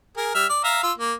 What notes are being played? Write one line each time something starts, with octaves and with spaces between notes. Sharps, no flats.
G#4 A#4
G3 E5 F6
D5
E5 F5 A#5
F4 E6
A#3